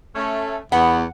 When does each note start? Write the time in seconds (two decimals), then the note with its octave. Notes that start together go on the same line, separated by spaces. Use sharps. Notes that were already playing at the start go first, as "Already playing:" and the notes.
0.16 A3 C#4
0.72 E2 B3 F#5